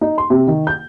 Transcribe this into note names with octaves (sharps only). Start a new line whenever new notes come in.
D#4
C6
C3
D#3
G6